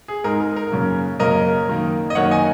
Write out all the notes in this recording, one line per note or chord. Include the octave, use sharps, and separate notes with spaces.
G#4
G#2 G#3 D#4 A#4
A#4
A#4
F#2 C#3 A#3 C#4
F#2 C#3 A#3 C#4 A#4 D#5
F#2 D#3 A#3
D#5
F#2 D#3 A#3 C#5 F#5
D#5 G#5